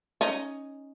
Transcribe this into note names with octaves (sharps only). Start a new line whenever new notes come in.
C#4 D#4